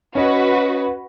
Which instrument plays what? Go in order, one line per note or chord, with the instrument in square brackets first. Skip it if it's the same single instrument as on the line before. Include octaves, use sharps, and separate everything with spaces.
[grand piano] C#4 D#5 [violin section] F#4 B4